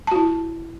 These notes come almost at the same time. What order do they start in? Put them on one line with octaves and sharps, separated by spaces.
A5 F#4 E4